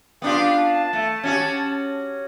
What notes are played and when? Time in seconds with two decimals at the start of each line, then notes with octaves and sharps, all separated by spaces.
0.22 B3 D4 F4 G4
0.59 A5
0.93 A3
1.24 C#4 F#4 G4